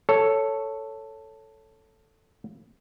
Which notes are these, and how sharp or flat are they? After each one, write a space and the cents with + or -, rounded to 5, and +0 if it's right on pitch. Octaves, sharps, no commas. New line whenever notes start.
A4 +5 C#5 +0